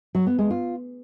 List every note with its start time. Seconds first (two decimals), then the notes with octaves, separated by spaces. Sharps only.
0.15 F#3
0.27 B3
0.38 G#3
0.50 F4